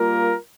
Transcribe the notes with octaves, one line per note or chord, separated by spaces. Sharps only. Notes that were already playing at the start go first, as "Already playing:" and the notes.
Already playing: G3 A#3 F4 A#4